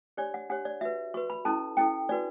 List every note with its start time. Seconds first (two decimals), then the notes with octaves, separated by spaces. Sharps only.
0.17 D4 G4 C#5 D5
0.34 F#5
0.50 D4 G4 C#5 F#5
0.65 D5
0.81 F#4 B4 E5
1.14 F#4 B4 C#6
1.30 B5
1.45 C#4 E4 A4 A5
1.77 C#4 E4 A4 G5
2.09 D4 F#4 B4 D5